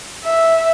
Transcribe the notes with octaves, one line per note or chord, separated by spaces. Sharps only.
E5